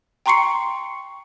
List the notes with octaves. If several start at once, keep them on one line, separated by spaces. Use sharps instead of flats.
G5 A#5 C6 C#6 C7 C#7